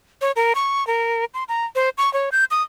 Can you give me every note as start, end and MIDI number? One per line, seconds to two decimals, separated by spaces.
0.21 0.32 73
0.36 0.53 70
0.55 0.86 85
0.87 1.25 70
1.34 1.44 84
1.48 1.65 82
1.75 1.89 72
1.98 2.12 85
2.13 2.29 73
2.32 2.45 91
2.51 2.63 87